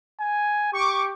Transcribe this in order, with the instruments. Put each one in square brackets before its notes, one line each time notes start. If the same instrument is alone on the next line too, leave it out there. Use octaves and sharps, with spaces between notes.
[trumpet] G#5
[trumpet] G4 [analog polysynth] C#6 D6